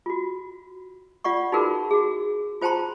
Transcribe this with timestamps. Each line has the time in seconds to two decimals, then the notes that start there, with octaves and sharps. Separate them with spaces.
0.06 F4 F#4
1.24 F4 D5 F#5 C#6
1.52 D#4 F4 F#4 G#4 A#4 B4
1.91 F#4 G#4
2.62 F4 C5 G5 A5 A#5 C6